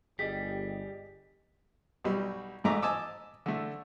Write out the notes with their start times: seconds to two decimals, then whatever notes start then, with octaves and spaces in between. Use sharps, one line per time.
0.19 G1 G3 G4 G#4 D#5 B6
2.04 B1 F#3 G3
2.64 A1 G#2 A3 A#5 D6
2.82 D#5 G#5 A5 D6 E6
3.46 D3 A3